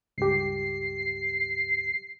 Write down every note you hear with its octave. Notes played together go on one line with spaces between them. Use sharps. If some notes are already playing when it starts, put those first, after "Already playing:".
C#2 G2 G4 C7